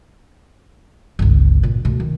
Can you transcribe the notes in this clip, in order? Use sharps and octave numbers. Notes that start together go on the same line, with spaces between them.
G1 C#2
A#2
B2 A3
D#3